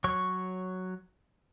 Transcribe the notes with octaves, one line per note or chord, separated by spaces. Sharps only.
F#3 C#5 C#6